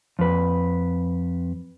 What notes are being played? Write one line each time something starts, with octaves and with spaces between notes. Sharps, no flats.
F2 B4